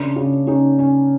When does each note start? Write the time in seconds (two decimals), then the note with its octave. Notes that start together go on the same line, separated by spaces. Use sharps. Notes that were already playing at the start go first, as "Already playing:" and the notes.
Already playing: C#3 D4
0.16 C#3
0.47 C#3 C#4 D#4
0.79 C#4